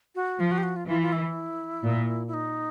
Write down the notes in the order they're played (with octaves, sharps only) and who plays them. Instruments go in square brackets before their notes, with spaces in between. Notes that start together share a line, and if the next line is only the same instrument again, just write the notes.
[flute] F#4
[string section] F3 [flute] F4
[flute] F#4
G4
F#4
F4
[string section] E3 [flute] F4
[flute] F4
E4
[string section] A#2
[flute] E4
D#4